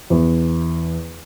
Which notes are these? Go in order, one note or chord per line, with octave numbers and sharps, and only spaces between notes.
E2